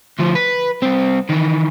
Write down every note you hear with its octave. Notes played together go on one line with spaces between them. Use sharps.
D2 F3
B4
C2 C4
D#3 E3